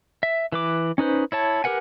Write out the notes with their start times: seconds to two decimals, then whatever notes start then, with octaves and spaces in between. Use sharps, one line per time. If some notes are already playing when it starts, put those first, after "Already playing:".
0.23 E5
0.52 E3 B4 D6
0.98 C#4 D#4 B4 C5
1.32 E4 C#5 A5
1.64 G4 A#4 B4 F#5 G#5